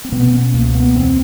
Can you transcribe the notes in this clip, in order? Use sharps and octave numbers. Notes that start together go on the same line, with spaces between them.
C4
B2 B3
C#4
C#2 A#3
B3
E2 C4